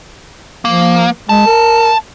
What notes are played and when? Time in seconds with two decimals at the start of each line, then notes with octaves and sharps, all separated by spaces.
0.65 F3 A#3
1.29 G#3 A5
1.46 A#4